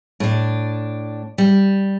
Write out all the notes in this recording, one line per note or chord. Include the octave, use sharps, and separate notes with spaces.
A2 D4
G3